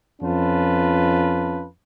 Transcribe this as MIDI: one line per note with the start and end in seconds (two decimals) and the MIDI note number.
0.22 1.66 41
0.22 1.66 61
0.22 1.66 65
0.22 1.66 71
0.22 1.66 81